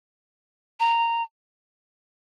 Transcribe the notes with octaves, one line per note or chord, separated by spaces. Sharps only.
A#5